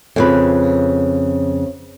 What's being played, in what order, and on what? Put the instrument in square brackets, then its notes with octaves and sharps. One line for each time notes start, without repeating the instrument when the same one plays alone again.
[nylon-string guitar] F2 C#3 B4